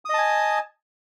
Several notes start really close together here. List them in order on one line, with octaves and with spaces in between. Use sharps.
D#6 D#5 A5 G#5